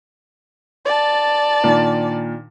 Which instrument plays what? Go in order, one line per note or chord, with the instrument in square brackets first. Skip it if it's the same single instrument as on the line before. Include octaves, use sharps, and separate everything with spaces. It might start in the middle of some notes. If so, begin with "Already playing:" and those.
[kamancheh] D5 A5
[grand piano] A#2 D#3 D4